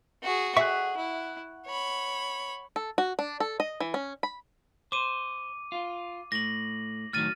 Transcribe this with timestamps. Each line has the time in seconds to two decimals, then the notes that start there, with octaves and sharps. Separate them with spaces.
0.23 F#4 G#4
0.57 G#4 E5 F#5 C#6
0.97 E4
1.66 C#5 B5
2.76 A4
2.98 F#4
3.19 D4
3.40 A4
3.60 D#5
3.81 E3
3.94 C#4
4.23 B5
4.92 C5 D6 D#7
5.72 F4
6.32 A2 A#6 F#7
7.13 A2 D#3 F#3 F6 A6 D#7